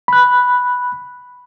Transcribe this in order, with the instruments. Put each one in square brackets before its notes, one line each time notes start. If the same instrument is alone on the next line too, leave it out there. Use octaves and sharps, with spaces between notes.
[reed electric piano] B5 F#6